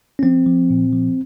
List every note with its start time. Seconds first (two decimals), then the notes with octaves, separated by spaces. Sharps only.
0.19 C#4
0.23 F3 C4
0.46 F3
0.70 A#2
0.93 F3